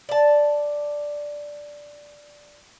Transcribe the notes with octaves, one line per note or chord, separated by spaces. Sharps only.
D5 A5